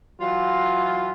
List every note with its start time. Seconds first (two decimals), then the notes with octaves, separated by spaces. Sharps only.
0.21 E3 F#3 F4